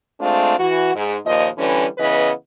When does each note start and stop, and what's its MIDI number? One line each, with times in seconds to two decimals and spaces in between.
0.20 0.55 56
0.20 0.55 57
0.20 0.55 60
0.20 0.55 62
0.20 0.55 65
0.59 0.92 52
0.59 0.92 66
0.95 1.16 44
1.25 1.47 39
1.25 1.47 46
1.25 1.47 53
1.25 1.47 75
1.58 1.86 50
1.58 1.86 52
1.58 1.86 55
1.58 1.86 61
1.58 1.86 71
1.98 2.30 49
1.98 2.30 52
1.98 2.30 59
1.98 2.30 71
1.98 2.30 75